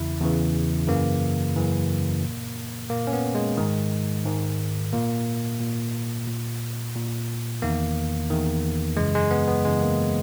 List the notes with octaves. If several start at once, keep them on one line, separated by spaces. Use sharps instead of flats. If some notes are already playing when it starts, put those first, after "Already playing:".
Already playing: E2 C#3 E3 E4
E2 C#3 E3
F#2 C#3 E3 A#3
F#2 C#3 E3
A#2
A#2 A#3
C#4
B3
G#3
G#2 D#3
G#2 D#3
A#2 A#3
A#2
A#2
A#2
E2 D#3 A#3
E2 D#3
F#2 C#3 E3 G#3
G#3
B3
B3
F#2 C#3 E3 G#3
A#3